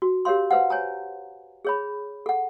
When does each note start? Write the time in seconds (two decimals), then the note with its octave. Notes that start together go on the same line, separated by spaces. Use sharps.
0.02 F#4
0.25 G4 A#4 C#5 F5 C6
0.51 B4 C5 F5 F#5
0.70 C#5 G#5 A#5
1.65 G#4 C#5 B5
2.26 A4 F#5